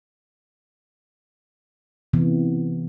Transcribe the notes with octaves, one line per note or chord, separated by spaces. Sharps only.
C3 E3 B3